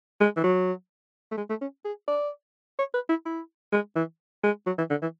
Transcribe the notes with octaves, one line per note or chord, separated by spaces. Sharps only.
G#3
E3
F#3
A3
G#3
A3
C#4
G#4
D5
C#5
B4
E4
E4
G#3
E3
G#3
F#3
E3
D3
E3